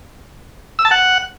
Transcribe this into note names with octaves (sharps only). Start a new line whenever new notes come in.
E6
A5
F#5